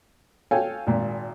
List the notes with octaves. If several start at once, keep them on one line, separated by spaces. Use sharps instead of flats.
A4 C#5 F5 G5 G#5
G#1 A#2